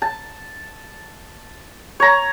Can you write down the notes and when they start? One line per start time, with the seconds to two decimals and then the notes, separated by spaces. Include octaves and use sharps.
0.02 A5
2.00 C#5 A#5